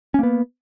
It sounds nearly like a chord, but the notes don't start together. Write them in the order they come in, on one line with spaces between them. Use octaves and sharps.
C#4 A#3 B3